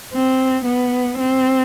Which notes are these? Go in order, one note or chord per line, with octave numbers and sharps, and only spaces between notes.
C4
B3
C4